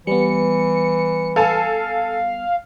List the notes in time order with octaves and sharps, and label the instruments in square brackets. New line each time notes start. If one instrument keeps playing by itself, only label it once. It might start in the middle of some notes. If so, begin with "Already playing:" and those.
[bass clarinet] E3 [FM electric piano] G3 B3 [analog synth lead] C#7
[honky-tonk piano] A4 G#5 A5 [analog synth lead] F5